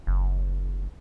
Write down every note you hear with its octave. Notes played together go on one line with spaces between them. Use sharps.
F#1